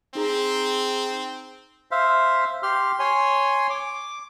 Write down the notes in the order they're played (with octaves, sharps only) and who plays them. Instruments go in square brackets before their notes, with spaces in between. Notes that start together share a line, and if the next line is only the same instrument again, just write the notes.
[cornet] C4 [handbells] D#4 G#4 A#5
[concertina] C5 E5 F5
G4 C6 F6
C#5 G#5 C6
D6